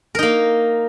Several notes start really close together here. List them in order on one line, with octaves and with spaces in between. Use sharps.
A#4 D#4 A#3